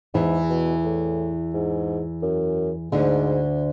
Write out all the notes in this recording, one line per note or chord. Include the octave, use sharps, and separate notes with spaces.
E2 G#2 E3
B2
A2
G#2
F#2
D2 G#2 D3